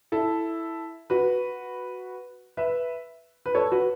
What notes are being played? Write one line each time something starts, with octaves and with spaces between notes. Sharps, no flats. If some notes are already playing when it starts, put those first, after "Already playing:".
E4 A4
F#4 B4
B4 E5
B4
A4 C#5
F#4 B4